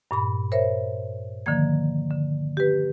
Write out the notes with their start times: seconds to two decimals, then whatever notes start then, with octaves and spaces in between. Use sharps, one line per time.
0.11 G2 A#2 B5
0.52 A#4 C5 C#5 E5
1.46 D3 D#3 F3 A#3 G#6
2.11 D3
2.57 G4 B4